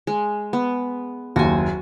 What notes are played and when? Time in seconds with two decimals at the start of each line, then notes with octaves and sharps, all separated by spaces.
0.07 G#3
0.53 B3
1.36 F#1 D#2 F#4 G#5